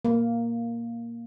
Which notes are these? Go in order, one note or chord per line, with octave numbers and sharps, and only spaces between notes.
A#3